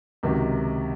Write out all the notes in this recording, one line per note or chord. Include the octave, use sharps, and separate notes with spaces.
C#2 C3 D#3 F#3